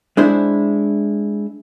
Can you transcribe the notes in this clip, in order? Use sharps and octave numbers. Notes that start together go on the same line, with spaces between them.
G#3 D4 E4 C5